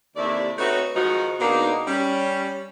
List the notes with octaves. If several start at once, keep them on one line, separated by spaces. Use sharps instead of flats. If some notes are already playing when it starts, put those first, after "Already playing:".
D#2 C3 A3 E4 D5
A3 C4 D#4 F#4 B4 C#5
G#2 D#3 F3 D#4 F#4
B2 G#3 A#3 D4 D#4
G3 C#4